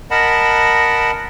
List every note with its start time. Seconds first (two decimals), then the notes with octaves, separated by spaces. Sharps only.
0.11 A#4 D#5 F#5 A5 B5